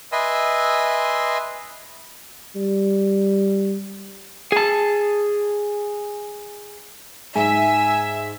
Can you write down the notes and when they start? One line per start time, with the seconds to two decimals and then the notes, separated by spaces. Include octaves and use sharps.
0.12 B4 D#5 E5 G#5 C6 E6
2.56 G3
4.52 G#4 A5
7.36 G#2 E5 G#5